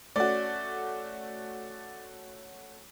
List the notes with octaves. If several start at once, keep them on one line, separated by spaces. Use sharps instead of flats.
A3 C#4 F#4 D5